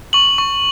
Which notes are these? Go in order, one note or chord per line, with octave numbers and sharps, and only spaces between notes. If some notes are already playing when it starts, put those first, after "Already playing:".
C#6 F#7
C#6